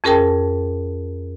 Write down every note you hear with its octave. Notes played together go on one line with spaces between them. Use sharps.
F2 C#4 G#4 A#4 G5 A5